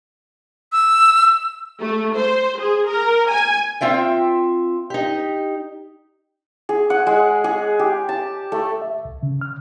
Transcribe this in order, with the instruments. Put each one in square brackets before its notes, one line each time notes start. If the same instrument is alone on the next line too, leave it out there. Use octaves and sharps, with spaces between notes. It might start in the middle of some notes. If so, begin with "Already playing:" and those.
[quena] E6
[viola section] A3
C5
G#4
A#4
G#5
[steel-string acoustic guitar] C4 F4 E5 G5
D#4 G4
[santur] G#4
F#5
G#3
G#4
G4
A5
A3
[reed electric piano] E5
C2
C#3
F6